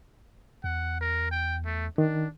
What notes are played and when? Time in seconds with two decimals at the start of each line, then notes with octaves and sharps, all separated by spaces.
0.64 E2 F#5
1.01 A#4
1.31 G5
1.65 A3
1.98 D#3 D4